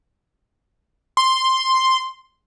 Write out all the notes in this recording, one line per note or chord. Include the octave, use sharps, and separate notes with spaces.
C6